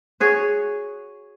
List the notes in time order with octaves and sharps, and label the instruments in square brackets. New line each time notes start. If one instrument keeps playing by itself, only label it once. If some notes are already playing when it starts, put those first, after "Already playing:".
[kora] F#4 G#4 C#5